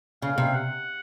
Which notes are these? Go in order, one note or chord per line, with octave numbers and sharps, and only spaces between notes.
C#3 F5
C3 F5
F#5